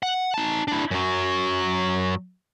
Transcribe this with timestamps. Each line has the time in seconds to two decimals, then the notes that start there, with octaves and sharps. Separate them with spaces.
0.03 F#5
0.34 D#4 A5
0.68 D4 E4
0.91 F#2 F#3